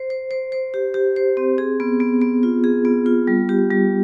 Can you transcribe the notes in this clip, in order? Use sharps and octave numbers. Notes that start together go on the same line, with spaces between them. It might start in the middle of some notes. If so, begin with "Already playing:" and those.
Already playing: C5
C5
C5
C5
G4
G4
C5
C4
G#4
B3
B3
B3
F4
G#4
B3
F4
G3
G4
G3